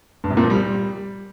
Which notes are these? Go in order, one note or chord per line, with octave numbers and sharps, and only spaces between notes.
G2
C3
A#2
F3
G3